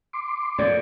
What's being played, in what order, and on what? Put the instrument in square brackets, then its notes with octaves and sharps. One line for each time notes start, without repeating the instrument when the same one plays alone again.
[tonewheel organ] C6 D6
[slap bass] F2 A#2 [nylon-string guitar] D5